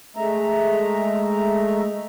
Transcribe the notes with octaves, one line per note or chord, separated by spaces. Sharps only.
G#3 A3 E5 A#5